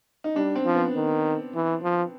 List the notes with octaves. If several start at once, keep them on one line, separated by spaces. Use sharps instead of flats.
D#4
G3 D4
C4
F3
B3
D#3
E3
F3